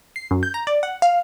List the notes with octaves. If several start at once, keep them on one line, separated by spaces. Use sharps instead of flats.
C7
F#2
G6
A#5
D5
F#5
F5